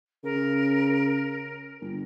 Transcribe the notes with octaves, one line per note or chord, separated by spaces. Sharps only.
C#3 A#4
G1